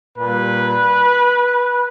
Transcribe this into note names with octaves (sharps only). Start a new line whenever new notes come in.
A#2 G3 B4